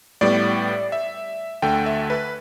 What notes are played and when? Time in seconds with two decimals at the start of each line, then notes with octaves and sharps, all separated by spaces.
0.21 A2 G3 B3 D5
0.92 E5
1.62 D2 D3 A3 G5
1.86 E5
2.10 B4